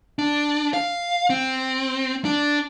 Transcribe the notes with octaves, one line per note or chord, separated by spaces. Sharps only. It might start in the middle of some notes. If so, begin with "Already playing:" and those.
D4
F5
C4
D4